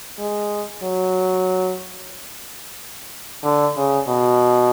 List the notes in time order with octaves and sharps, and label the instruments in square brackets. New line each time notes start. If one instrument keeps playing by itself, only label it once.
[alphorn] G#3
F#3
D3
C#3
B2